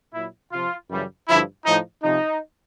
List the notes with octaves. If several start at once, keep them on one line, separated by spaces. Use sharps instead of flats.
A#2 F#3 E4
C3 F3 F4
F#2 C#3 E3 G3
G2 D3 F3 E4
A2 F3 D#4
C3 F3 D#4